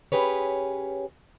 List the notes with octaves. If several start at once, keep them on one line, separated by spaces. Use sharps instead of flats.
C#4 F4 G4 G#4 B4 C#5